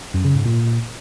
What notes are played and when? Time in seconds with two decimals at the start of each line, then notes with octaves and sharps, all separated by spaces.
0.14 F#2
0.25 C#3
0.35 G#2
0.45 A#2